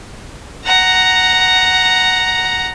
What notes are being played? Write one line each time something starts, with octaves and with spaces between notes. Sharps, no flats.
F#5 A#5